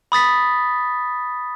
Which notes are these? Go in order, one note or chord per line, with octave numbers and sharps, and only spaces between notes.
B5 D#6 A6 B6